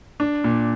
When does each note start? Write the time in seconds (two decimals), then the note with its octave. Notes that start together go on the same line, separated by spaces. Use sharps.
0.20 D4
0.44 A#2